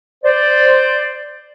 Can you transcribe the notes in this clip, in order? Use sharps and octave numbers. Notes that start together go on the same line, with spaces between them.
C5 D5